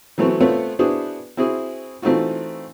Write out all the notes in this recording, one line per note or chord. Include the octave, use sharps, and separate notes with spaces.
E3 F#3 A3 B3 C4 F#4
A3 B3 C4 F4 C#5
B3 D4 E4 F#4 G#4 C5
C4 E4 F#4 G#4
E3 A3 C4 D#4 F4 F#4